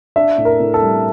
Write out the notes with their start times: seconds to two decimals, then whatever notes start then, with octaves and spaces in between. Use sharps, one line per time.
0.16 D4 E5
0.38 A2
0.45 A#4
0.60 A2
0.74 A4
0.82 G3